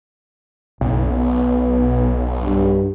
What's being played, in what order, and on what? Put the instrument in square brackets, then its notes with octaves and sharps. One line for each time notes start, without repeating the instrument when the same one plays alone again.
[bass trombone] F#1 [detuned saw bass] B1
[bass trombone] B3
G2